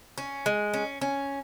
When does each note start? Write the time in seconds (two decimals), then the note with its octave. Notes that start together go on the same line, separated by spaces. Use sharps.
0.18 C#4
0.46 G#3
0.74 C#4
1.01 C#4